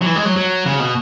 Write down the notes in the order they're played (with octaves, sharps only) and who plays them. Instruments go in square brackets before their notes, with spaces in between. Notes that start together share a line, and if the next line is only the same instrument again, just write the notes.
[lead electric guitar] F#3
E3
G#3
F#3
F#3
C#3
B2